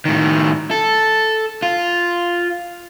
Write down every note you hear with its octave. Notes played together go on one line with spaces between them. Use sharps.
A2 D#3
A4
F4